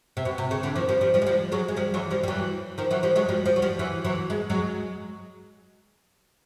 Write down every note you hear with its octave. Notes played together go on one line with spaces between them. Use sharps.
C3
B2
C3
C#3
D3 E3
D#3 F3
F3 G3
F3 G3
F3 G3
G#3
F3 G3
F#3 G#3
G#3
F3 G3
E3 F#3
F3 G3
G3
E3 F#3
D#3 F3
E3 F#3
F3 G3
F#3 G#3
F3 G3
F3 G3
F#3
F3 G3
E3 F#3
E3 F#3
G#3
F#3 G#3